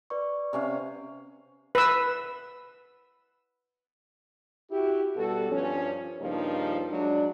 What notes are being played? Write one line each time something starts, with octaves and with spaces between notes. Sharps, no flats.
B4 D5 C#6
C3 C#4 F5
B4 E6
E4 F#4 G4
B2 G3 F#4 A4
G2 F3 C#4
G2 C#3 F3 A#3 D#4
F#3 G#3 D4